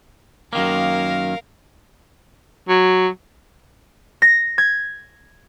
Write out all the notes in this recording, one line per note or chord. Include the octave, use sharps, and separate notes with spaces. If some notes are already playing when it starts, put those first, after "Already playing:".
F#2 D#3 A#3 A#4 F5
F#3
A#6
G#6